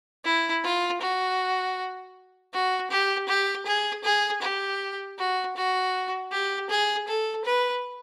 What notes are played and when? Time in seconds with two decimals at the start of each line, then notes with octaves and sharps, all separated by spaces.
0.25 E4
0.64 F4
1.01 F#4
2.53 F#4
2.90 G4
3.29 G4
3.66 G#4
4.04 G#4
4.42 G4
5.18 F#4
5.56 F#4
6.32 G4
6.70 G#4
7.08 A4
7.45 B4